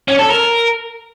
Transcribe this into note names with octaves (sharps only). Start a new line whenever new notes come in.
C#4
A4
A#4